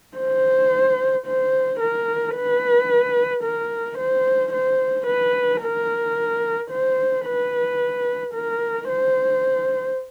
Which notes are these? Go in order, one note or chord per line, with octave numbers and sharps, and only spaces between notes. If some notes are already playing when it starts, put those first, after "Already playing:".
C5
C5
A#4
B4
A#4
C5
C5
B4
A#4
C5
B4
A#4
C5